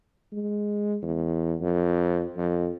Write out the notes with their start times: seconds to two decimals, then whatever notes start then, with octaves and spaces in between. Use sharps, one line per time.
0.33 G#3
1.03 E2
1.61 F2
2.37 F2